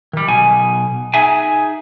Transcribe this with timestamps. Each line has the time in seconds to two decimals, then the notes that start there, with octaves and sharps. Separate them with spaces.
0.13 D#3 G3
0.27 B1 B2 G#5
1.14 D#4 G#4 E5 G#5